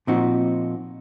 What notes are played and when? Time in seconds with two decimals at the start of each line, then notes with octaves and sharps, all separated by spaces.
0.07 A#2 F3 C4 D#4 F#4